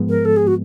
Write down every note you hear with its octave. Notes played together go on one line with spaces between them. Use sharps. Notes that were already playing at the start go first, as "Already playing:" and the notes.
Already playing: G#2 F3 G#3 B3
A#4
A4
G#4
F#4